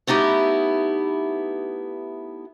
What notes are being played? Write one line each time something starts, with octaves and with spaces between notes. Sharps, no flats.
A3 B3 D#4 E4 G4